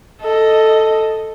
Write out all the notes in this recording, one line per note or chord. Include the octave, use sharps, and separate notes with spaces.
A4 D#5